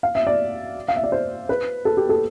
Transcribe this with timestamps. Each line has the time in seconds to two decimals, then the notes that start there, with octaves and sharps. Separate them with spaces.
0.03 F5
0.15 E5
0.27 D5
0.88 F5
0.96 E5
1.04 D5
1.12 C5
1.49 B4
1.85 A4
1.97 G4
2.09 A4